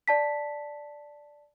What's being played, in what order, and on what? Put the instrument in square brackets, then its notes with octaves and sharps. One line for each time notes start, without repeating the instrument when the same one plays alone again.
[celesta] D5 A5 B6